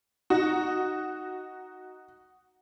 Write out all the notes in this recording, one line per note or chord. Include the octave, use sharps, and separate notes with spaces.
D#4 F#4